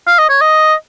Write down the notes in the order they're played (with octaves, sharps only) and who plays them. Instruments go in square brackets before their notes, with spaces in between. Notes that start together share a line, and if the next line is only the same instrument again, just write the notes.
[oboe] F5
D#5
C#5
D#5